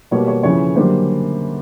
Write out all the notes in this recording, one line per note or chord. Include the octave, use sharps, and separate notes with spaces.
B2 G3 A#3 C#5
C#5
F2 C#3 E3 C#5
F#2 D3 G3 A#3 C5